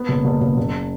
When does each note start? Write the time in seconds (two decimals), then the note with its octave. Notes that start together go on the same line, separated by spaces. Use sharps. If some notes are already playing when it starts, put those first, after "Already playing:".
Already playing: B3
0.09 F#1
0.25 F#1
0.41 F#1
0.57 F#1